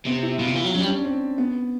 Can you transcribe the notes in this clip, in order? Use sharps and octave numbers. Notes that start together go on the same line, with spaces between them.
C3 B3
E4
B2 F4
C3
E3 F4
F#3
F#3 C#4
G3
D4
C#4
C4
B3